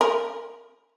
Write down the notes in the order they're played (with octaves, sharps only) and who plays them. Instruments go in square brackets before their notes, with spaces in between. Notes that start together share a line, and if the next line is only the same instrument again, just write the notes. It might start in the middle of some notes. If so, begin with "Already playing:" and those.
[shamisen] A#4